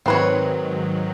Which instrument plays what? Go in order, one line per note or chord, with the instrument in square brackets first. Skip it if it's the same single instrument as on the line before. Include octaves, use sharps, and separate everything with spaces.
[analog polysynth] G#2 D#3 F#3 [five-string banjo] C4 B4 C#5